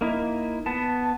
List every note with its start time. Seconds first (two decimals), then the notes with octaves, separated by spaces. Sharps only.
0.01 A#3 D#4 E4
0.66 B3 A5